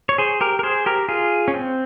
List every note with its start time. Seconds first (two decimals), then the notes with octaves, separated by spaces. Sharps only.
0.09 C#5
0.18 G#4 C5
0.41 G4 A#4
0.59 A#4
0.63 G#4 C5
0.86 G4 A#4
1.09 F4 G#4
1.48 C#4
1.54 C4